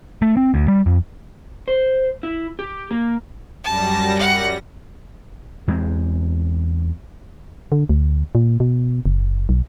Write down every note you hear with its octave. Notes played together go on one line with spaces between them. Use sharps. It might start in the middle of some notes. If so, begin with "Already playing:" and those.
A3
C4
D2
G3
F2
C5
E4
G4
A#3
F#2 G3 A5 A#6
F#5
E2 G#3 A3 C4
D3
D2
A#2
B2
F#1
B1